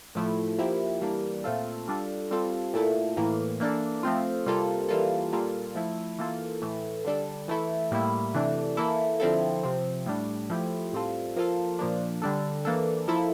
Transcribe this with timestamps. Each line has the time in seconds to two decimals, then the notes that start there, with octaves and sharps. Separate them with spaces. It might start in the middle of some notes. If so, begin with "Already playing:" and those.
0.15 A2 F3 A3 E4
0.58 F3 A#3 E4 G4
1.02 E3 G3 A#3 D4
1.44 A#2 A3 C4 F4 A4
1.88 G3 D4 F4 A4
2.31 G3 C4 F4 A4
2.74 A#2 A3 E4 A4
3.17 A2 E3 A#3
3.60 E3 A#3 D4 A4
4.03 F3 A3 C4 F4
4.46 C3 G3 A#3 F4 A4
4.89 E3 G3 A#3 F4 A4
5.33 A#2 G3 A#3 F4 A4
5.75 F3 A3 E4 A4
6.19 E3 A#3 F4 A4
6.62 A2 E3 A3
7.04 D3 G3 D4 A4
7.48 E3 A3 E4 A4
7.91 A2 G3 A#3 E4
8.34 C3 E3 A3 D4
8.77 E3 A#3 E4 A4
9.20 D3 F3 C4 E4 A4
9.63 C3 F3 C4
10.06 A2 G3 D4
10.50 F3 A3 E4 G4
10.93 A2 G3 C4 F4 A4
11.36 F3 A#3 F4 A4
11.79 A#2 F3 A#3 D4
12.22 D3 G3 D4 A4
12.65 E3 A#3 D4 A4
13.08 F3 A#3 E4 A4